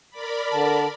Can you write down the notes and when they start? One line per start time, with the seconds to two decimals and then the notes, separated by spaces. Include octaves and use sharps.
0.11 A#4 D5 B5
0.52 D3 A5